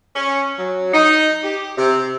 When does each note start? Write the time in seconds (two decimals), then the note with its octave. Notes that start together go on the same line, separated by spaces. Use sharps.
0.16 C#4
0.59 F#3
0.92 D#4
1.43 G4
1.77 C3